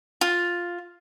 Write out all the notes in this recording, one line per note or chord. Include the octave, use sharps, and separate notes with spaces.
F4